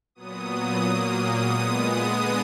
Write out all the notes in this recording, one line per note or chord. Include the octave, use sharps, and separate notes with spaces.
A#2 F#3 B3 D#6
A#2 F#3 A#3
A#2 G#3 B3 D#6
D#6
D3 G#3 B3 D#6